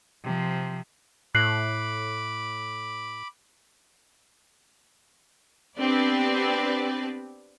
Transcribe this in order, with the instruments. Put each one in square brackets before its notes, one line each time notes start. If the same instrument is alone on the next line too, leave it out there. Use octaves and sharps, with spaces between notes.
[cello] C3 F3
[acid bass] A2 [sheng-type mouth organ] B5 D6 [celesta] F#6 C7 F#7
[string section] B3 C4 D4 G4 B4 D5